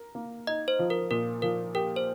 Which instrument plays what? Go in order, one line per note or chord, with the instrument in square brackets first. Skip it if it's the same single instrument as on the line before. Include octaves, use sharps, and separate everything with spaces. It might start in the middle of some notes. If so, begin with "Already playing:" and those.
Already playing: [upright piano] A#4
A#3
[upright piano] D#4 [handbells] D#5
[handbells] C5
[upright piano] F3
[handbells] A#4
[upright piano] A#2 [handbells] A#4
[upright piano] F3 [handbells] A#4
[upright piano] G4 [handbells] A#4
[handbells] C5